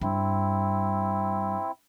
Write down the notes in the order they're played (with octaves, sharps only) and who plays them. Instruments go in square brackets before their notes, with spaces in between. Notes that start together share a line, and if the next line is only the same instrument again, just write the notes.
[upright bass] G2 [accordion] C4 E4